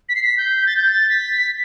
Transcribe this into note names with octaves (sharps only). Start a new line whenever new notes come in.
B6
C7
B6
G6
A6
G6
A6
B6